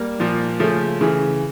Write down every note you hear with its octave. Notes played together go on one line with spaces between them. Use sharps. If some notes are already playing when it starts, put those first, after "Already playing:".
Already playing: G3 A#3
A#2 F3
C#3 F3 A3 C#4
C#3 E3